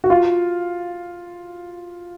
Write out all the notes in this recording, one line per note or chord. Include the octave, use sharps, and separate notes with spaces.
F#4
F4